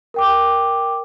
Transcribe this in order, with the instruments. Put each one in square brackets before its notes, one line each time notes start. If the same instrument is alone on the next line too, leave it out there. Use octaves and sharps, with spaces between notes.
[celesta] A#4 G5 D6